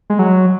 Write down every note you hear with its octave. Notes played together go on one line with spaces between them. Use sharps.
G#3
F#3